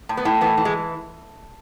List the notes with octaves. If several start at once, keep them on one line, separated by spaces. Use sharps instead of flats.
A2
B3
A2
E3 B3
E3
G#3